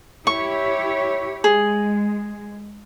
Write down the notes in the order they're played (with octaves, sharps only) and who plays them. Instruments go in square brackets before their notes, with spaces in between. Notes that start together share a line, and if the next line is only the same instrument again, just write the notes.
[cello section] E4 G4 C#5 [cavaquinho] C#6
[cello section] G#3 [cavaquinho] G#4